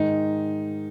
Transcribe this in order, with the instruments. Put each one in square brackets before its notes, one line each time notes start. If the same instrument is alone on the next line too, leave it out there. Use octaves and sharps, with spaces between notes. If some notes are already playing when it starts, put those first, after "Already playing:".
Already playing: [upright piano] G#2 D#3 D#4